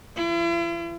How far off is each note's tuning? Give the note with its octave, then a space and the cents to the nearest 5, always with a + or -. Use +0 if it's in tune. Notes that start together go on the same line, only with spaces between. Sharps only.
E3 +0 E4 +45